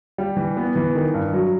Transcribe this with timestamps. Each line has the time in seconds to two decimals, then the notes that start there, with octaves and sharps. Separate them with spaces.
0.18 G3
0.37 E3
0.57 B3
0.76 E3
0.95 D#3
1.14 G2
1.33 F#3